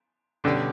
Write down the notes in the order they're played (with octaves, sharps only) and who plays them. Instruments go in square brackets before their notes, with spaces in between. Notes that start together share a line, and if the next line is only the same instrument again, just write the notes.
[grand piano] B2 G3 C#4 G4 D5 [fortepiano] D3